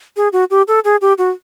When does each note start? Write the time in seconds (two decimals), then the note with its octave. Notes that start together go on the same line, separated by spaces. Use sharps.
0.17 G#4
0.33 F#4
0.51 G4
0.68 A4
0.85 G#4
1.01 G4
1.18 F#4